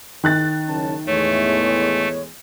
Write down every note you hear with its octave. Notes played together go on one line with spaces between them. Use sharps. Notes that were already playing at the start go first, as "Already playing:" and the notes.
D#3 F#6 A6
F#1 C#4 A5
E2 A2 G#3 A3 C#5